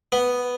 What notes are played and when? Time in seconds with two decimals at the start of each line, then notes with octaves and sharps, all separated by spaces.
0.12 B3